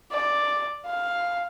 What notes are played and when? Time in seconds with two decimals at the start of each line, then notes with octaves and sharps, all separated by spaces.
0.11 D5
0.86 F5